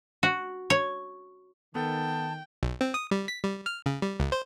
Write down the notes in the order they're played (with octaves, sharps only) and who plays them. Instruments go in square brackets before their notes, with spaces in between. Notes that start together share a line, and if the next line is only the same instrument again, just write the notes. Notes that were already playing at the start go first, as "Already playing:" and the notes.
[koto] F#4
C#5
[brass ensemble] D#3 [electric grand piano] B3 A4 [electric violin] G5 [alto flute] A5
[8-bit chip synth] B1
C4
D#6
G3
B6
G3
F6
C#3
G3
C#2
C5